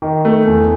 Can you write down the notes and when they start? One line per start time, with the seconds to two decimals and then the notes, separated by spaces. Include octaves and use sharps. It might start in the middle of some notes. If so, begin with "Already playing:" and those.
0.02 D#3
0.25 A3
0.47 E2